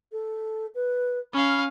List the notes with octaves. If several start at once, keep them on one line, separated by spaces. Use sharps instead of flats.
A4
B4
C#4 F5 B5